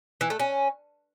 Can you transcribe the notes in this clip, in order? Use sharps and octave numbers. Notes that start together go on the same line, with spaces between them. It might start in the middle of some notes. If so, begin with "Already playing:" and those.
E3
A3
C#4